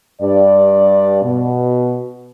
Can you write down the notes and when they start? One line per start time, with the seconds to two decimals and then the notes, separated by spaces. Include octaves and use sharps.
0.22 G2 D5
1.22 B2